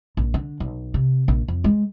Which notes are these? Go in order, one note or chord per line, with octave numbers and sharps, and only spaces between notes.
A#1
D3
B1
C3
A#1
F2
G#3